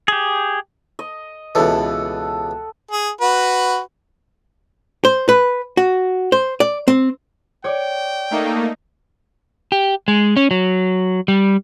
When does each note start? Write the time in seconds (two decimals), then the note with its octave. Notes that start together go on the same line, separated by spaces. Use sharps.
0.08 G4 G#4
0.99 D#5
1.55 C#2 B2 E3 A4 F#5
2.91 G#4
3.21 F#4 B4
5.05 C5
5.29 B4
5.77 F#4
6.32 C5
6.60 D5
6.88 C4
7.64 C#5 D5 G5
8.31 A3 A#3 D#4
9.72 G4
10.08 G#3
10.37 C#4
10.51 F#3
11.28 G3